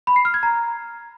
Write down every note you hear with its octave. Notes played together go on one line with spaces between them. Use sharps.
B5
C7
F6
G#6
A#5